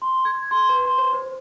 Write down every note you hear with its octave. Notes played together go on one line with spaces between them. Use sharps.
C6
G#6
C6
B4
C6
C5
C5